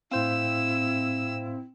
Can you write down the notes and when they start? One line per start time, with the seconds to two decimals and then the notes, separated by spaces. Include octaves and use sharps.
0.11 A2 C4 E4 C5 F5 E6